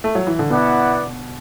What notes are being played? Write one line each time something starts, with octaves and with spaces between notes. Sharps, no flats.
A3
F#3
E3
D3
B2 B3 E4 D5 F#5